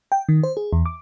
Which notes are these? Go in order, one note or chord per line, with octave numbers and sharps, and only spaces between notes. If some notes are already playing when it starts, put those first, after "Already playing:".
G5
D#3
C5
G#4
E2
D6